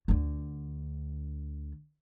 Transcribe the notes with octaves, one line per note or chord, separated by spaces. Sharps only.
D2 D3